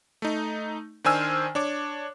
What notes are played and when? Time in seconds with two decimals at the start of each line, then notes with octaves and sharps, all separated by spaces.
0.22 A3 D#4
1.04 D#3 D4 C5 G#5 E6 F6
1.55 D4 C#5 D6